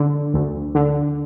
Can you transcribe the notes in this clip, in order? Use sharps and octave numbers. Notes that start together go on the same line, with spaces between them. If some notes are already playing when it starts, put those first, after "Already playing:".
Already playing: D3
D2
D3